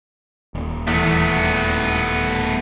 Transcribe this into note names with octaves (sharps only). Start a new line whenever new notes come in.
D#1
E2 A3 B3